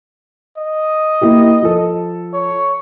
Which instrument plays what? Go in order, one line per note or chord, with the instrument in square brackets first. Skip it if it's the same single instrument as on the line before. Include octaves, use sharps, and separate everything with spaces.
[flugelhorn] D#5
[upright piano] A#3 E4 G4
F3 A4
[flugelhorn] C#5